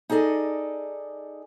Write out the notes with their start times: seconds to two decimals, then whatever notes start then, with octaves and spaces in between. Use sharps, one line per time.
0.10 D#4 G#4 A4 D5 D#5